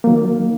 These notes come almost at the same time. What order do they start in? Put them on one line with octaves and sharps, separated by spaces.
A#3 F#3 D#3